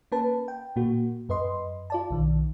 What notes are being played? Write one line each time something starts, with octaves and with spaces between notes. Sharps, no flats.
A#3 C#4 B4 A5
G5
A#2 A#3 F#4
F#2 B4 D#5 C6
F4 D5 A5
B1 D#3